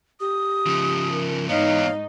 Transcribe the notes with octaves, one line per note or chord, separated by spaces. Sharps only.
G4 D#6
C#3 F3
A#4
G#2 E3 B3 D#4 C#5 F5